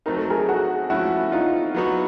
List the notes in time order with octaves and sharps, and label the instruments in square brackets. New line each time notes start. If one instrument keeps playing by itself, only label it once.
[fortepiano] F#3 A3 C4 D#4 [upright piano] A#4
[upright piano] A4
G#4 A#4
F#4 G#4
[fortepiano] F3 A3 C#4 [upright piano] E4 F#4
[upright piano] D#4 F4
[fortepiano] F#3 B3 D#4 F#4